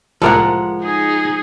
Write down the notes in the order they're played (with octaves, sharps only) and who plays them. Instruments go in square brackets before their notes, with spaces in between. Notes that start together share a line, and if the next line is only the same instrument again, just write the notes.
[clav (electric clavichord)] C2 A2 A#3 [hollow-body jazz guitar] F3 G#3 [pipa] A4 A#4 F#5
[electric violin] D#4 G#4